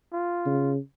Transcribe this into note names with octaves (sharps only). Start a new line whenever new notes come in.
F4
C#3